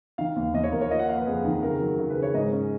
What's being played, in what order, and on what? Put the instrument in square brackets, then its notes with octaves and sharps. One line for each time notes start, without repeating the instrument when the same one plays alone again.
[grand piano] D#3 F5
D#2
D#2 D#5
C#5
D#2 A#4
C#5
F4 D#5
F#5
A#3 F5
B4
F2 G#4
D#3
C#3 A#4
F#3
C#3
B4
C#3
C#5
G#2 D#5
C#4